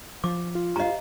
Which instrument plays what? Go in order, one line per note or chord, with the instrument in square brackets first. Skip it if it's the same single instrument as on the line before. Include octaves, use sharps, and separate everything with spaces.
[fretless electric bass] F3 [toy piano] D6
[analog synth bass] F4
[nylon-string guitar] G4 C5 F5 [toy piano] D#5 A#5